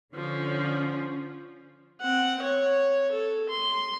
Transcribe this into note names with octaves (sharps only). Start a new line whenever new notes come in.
D3 F3 C#4
C4 F#5
C#5
A4
C6